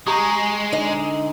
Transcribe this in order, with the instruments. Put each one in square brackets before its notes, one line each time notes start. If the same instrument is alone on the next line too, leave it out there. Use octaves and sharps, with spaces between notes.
[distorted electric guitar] G#3 [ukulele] G4 A#5 [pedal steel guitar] C#6 D#6
[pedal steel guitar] D3 D#4 [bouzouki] D#5